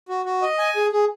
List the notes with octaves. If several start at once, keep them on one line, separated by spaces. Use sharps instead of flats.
F#4
F#4
D#5
G#5
G#4
G#4